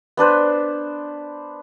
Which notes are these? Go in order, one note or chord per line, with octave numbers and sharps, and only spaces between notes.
B3 D4 B4 C5